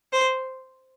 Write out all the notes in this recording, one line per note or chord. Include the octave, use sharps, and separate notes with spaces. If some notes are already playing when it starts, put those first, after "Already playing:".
C5